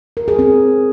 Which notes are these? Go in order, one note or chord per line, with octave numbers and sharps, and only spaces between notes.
A#4
G#4
C4